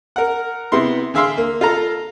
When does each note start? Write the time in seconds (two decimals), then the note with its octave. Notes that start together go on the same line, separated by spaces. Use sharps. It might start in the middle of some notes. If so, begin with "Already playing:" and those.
0.16 A#4 F#5
0.72 C3 B3 E4 C6
1.14 D3 G#4 E5 F5 C6 E6
1.38 A#3
1.61 F4 A4 A#5